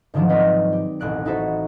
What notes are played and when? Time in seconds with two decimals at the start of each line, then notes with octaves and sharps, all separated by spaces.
0.14 G#2 D3 D#3 F3 F#3 D4
0.29 G#3 C4 B4 D5 D#5
0.72 G4
1.00 E1 A1 F#6 D7
1.25 D#4 E4 F#4 A4 C5